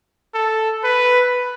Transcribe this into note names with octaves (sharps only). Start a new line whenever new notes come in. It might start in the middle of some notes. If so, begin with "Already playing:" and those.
A4
B4